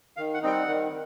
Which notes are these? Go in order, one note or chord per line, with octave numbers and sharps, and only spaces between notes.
D#3 F5
F#5
G3 C4 D#4 G5
F#5
D#3